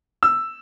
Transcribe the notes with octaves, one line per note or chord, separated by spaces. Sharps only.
E6